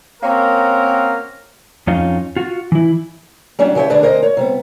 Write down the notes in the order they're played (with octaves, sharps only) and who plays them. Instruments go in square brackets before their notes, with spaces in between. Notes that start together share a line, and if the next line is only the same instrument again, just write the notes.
[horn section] A#3 C4 C#4 F#4 A#4
[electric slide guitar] F2 C#4 D#4 F4
F4 F#4
E3 E4
[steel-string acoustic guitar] F#3 G3 C#4 D4 E4
C#3 G4 C5 C#5 E5
D2 D3 D4 G#4 B4 D5
D2 A#4 C5 D#5
C#5
C3 G3 B3